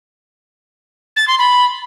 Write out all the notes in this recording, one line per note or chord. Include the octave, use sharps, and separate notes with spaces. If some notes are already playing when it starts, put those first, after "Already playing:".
A6
C6
B5